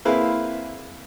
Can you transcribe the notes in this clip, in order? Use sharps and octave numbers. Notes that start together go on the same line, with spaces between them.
A#3 C4 E4 G#4 B4 F5